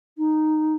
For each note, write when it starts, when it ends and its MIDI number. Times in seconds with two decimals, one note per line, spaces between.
0.17 0.75 63